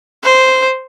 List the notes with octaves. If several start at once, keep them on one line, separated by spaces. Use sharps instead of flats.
C5